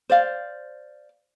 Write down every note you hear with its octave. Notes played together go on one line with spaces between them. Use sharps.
C5 D5 F5